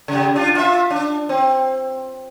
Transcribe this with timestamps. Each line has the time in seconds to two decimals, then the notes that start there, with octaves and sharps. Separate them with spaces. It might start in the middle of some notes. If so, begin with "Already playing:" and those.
0.08 C#3 G3
0.36 D4 F4
0.55 F4 E5
0.91 D4
1.29 C4